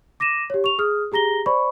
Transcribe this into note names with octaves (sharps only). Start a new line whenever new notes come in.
D6 A#6 D#7 E7
G4 C#5
C#6 F7
G#4 D#6 F6
G4 G#4 A#5 A#6 G7
C5 D5 B5 C#6